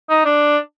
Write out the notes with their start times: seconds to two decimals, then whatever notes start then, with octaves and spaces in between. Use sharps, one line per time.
0.09 D#4
0.25 D4